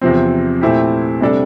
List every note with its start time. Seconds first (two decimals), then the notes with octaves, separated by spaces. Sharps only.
0.01 E2 C3 F3 C4
0.61 A#2 A3 C4 E4 G4
1.21 C3 G3 D4 A4